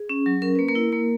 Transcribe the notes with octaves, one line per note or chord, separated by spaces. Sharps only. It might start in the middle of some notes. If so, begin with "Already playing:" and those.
Already playing: G#4
C#4
F#3
C#4 A#4
A#3 B4
A#3 A#4
E4
A#3